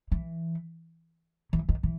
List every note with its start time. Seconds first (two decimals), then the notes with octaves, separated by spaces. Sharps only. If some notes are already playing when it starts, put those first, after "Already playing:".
0.12 E3
1.53 E3
1.69 D#3
1.83 E3